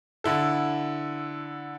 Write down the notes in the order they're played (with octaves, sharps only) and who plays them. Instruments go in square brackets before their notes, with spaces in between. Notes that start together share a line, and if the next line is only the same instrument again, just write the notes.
[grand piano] D3 E4 A4